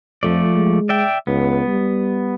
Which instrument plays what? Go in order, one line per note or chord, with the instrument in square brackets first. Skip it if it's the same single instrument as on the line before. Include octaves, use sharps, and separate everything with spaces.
[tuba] F2 [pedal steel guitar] F3 A3 D5
[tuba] G#3
[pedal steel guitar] D5 E5 G5
[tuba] C#2 [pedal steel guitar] B3
[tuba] G3